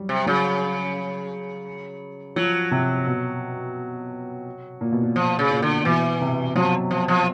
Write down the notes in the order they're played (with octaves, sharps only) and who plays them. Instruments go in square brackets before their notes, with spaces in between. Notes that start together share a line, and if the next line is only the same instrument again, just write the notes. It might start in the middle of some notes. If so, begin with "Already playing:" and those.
Already playing: [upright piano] F#3 G3
[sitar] C3
[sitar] C#3 [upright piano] F#3
[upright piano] F3 [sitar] F#3
[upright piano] C3
B2
A#2
B2
A#2
[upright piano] A#2 [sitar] F3
[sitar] C#3
[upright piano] A#2
[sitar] D3
[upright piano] B2 [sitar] E3
[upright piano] C3
[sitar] F3 [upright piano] F#3
[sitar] F3
F3